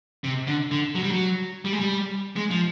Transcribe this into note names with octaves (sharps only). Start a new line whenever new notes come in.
C3
D3
D3
F#3
G3
F#3
G3
G#3
G3
G#3
F3